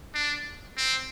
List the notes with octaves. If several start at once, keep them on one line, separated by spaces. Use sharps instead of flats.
D4
C4